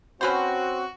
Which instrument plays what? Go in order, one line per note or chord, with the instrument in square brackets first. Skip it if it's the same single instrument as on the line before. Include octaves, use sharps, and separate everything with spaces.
[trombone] C4 [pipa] C#4 B4 C5 [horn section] F#4